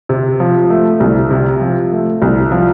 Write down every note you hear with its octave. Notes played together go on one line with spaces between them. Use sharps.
C3
F3
A3
C2
C3
F3
A3
C2
F3